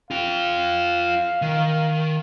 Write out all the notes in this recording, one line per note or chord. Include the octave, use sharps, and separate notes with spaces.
F4 F5 G5
D#3